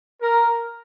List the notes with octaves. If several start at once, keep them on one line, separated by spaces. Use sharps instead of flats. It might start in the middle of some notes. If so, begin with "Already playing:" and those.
A#4